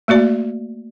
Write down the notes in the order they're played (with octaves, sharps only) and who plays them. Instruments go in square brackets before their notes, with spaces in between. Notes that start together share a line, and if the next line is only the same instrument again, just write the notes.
[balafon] A3 A#3 F#4 D5